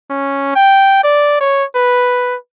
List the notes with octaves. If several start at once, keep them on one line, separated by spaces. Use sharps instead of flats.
C#4
G5
D5
C#5
B4